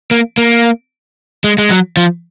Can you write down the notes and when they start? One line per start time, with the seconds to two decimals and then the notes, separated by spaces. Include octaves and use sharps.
0.11 A#3
0.38 A#3
1.44 G#3
1.58 G#3
1.70 F#3
1.97 F3